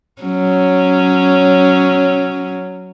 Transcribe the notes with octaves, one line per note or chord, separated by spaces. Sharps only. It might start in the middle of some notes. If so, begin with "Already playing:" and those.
F#3 C#4